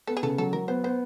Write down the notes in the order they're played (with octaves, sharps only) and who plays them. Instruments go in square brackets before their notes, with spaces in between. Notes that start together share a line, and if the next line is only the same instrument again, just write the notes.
[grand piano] B3 [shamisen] A4
[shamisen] G#4
[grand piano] C#3 [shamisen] A4
[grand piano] F#3 [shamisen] A4
[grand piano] F#3 [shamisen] A#4
[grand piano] B3 [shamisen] C5
[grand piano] B3 [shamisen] C5